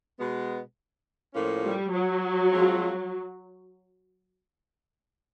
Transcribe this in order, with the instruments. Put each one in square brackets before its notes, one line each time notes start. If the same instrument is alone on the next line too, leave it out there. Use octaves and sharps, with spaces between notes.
[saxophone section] B2 G#3 B3
A2 F3 A#3 C#4 F4
[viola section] G3
F#3
[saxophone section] F3 G#3 C4 F4